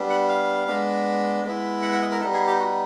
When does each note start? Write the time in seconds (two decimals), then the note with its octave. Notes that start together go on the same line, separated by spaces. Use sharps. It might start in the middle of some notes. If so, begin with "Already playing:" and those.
Already playing: G3 B3 D4
0.10 F#5
0.29 F5
0.68 G#3 B3 D4
1.44 G#3 B3 E4
1.82 F#5
1.93 F#5
2.02 D#5
2.11 A#4
2.20 G3 B3 D#4 A4
2.34 G#4
2.47 G4
2.60 F#4